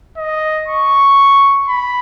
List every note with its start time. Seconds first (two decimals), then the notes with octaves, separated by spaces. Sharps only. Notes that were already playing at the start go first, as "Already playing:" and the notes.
0.17 D#5
0.68 C#6
1.68 B5